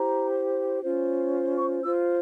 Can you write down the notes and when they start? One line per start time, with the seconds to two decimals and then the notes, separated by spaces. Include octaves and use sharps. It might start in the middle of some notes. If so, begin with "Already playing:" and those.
Already playing: E4 G4 C5 A#5
0.82 C#4 F4 C5
1.58 C#6
1.83 F4 C5 E6